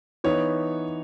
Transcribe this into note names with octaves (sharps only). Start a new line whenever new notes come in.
E3 B3 D#4 C#5